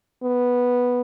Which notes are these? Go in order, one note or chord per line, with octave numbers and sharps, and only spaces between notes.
B3